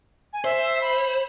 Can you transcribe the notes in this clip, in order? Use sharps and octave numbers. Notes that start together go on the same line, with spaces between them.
G#5
C5 E5
B5